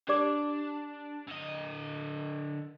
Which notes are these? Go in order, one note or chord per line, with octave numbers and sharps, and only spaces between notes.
D4 G4 D5 D6
D3 D#5